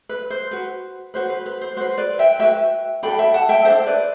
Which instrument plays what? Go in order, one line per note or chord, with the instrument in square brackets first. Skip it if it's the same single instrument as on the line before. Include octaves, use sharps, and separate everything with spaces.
[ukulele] B4
C5
F#4 B4
F#4 B4 C5
B4
B4
C5
F#4 B4 C5
B4 D5
E5 G5
F#4 B4 E5 G5
D4 F#4 A4 G5 B5
E5 G5
F#5 A5
E5 G5
D4 F#4 A4 C5 E5
B4 D5